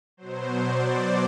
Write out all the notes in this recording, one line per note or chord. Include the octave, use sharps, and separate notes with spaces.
B2 F#3 C5
D5